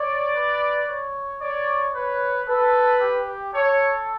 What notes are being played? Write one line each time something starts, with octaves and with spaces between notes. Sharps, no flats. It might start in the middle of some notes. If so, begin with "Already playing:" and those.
Already playing: C#5 D5
B4
C#5
C#5 D5
B4 C#5
A4 B4
G4
A4 C#5